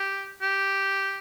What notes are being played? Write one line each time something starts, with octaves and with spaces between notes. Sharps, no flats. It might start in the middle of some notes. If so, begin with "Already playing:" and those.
Already playing: G4
G4